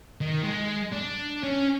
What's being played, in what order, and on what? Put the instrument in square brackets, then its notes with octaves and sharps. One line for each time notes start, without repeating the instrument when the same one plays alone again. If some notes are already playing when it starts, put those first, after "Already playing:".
[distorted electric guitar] D#3
G#3
D4
C#4